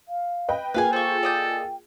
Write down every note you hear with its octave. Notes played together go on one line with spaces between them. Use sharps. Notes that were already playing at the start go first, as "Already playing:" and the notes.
F5
B4 D#5 G5
A#3 F4 G#4 B4 F5 G5 G#5
A4 C5 C#6
D5 D#5 G6